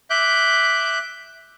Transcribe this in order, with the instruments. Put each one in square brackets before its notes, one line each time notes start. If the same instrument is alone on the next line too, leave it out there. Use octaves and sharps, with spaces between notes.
[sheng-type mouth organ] E5 D6 F#6 G6